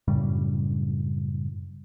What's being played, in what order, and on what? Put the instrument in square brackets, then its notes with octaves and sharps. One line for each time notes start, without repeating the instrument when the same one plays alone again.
[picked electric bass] F#2 A2 C#3 G3